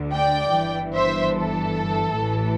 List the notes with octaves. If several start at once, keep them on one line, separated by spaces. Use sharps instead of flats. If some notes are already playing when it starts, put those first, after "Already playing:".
Already playing: D2 D3
D5 G5
G1 G2 E3
C5 E5
A4
A1 A2 E3